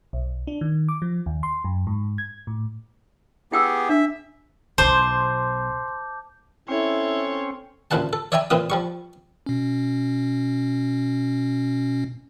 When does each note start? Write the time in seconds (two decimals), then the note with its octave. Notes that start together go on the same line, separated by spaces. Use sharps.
0.13 B1
0.47 D4
0.61 D#3
0.89 D6
1.02 F3
1.26 D#2
1.43 C6
1.65 F#2
1.87 G#2
2.18 G#6
2.47 A2
3.52 B3 E4 G4 G#4 G5 E6
3.89 D4 E5
4.78 B1 B2 C5 A5 C6 D6 G6
6.68 C4 C#4 E4 A4 C#5
7.91 A1 D2 A#2 C5 F#5 A5
8.13 A4
8.32 C#5 D5 E5 G5 G#5 A#5
8.50 A#2 E3 C4 F4 D#6
8.70 F3 G3 C#6
9.46 B2 C#4